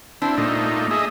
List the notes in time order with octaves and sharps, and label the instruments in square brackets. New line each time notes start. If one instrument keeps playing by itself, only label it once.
[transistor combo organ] C4 E4 [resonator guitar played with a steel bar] D4
[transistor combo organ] A#2 A3 D#4
G#4 D#5 E5